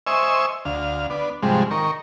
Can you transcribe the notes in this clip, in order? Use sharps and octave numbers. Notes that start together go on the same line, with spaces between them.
C5 D#5 E5 G#5 C#6 E6
D2 F5
B3 D4
G#2 C3 F3 G3 G#3
D#3 A#4 C#6